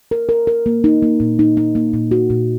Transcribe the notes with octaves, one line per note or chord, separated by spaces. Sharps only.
A#4
A#4
A#4
A#3
D#4
A#3
A#2
D#4
D#4
A#3
A#2
F#4
A#2